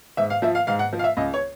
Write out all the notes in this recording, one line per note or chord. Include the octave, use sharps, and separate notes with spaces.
G#2 E5
F5
F3 E5
F5
G#2 F5
F#5
F3
F5
E5
C#2 D#5
C#5